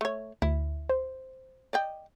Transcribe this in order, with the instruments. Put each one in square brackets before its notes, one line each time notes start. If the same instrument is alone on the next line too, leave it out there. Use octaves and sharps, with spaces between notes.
[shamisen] A3 C#5
[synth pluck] D2 [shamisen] E4
[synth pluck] C5
[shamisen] D5 D#5 G5